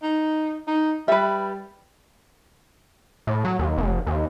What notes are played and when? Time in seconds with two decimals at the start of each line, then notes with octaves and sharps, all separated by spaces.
0.02 D#4
0.67 D#4
1.08 G3 B4 E5
3.27 A2
3.45 F#3
3.59 D#2
3.78 F1
4.07 D#2